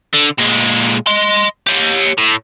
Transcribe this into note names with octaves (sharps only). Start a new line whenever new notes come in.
D3
A#2 G#3
D#5 C6
G4 C#5
A2